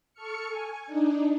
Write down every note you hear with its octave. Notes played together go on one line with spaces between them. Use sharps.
A4 C#6 F6 C#7
G#5
D4 D#4